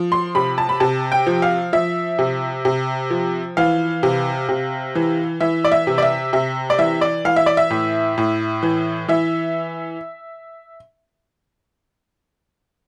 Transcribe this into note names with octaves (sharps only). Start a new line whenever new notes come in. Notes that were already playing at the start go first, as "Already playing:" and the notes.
Already playing: F3
C6
C3 B5
A5
B5
C3 A5
G5
F3
F5
F3 E5
C3
C3
F3
E3 F5
C3
C3
E3
E3 E5
D5
E5
C3
D5
E5
C3 E5
D5
E3 E5
D5
E3 F5
E5
D5
E5
A2
A2
E3
E3 E5